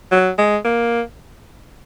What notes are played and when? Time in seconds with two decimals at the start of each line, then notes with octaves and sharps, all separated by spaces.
0.12 F#3
0.38 G#3
0.65 A#3